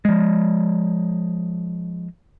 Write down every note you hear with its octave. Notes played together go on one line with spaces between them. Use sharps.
F3 G#3